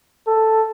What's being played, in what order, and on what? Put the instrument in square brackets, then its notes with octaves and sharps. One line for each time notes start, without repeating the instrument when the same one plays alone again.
[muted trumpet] A4